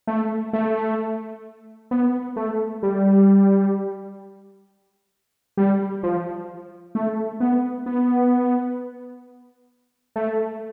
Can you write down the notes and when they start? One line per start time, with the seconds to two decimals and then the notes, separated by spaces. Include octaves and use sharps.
0.07 A3
0.53 A3
1.91 B3
2.36 A3
2.83 G3
5.57 G3
6.03 F3
6.95 A3
7.40 B3
7.86 B3
10.16 A3